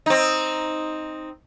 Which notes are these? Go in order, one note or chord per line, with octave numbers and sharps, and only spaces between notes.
C4 D#4